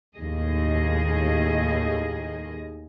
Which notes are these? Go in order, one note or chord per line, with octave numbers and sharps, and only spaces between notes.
D#2 A2 D#3 G#4 D#5